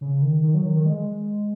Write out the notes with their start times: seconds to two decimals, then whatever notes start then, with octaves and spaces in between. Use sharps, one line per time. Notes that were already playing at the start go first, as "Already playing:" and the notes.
0.01 C#3
0.22 D#3
0.43 D#3
0.54 F#3
0.65 D#3
0.76 D#3
0.86 G#3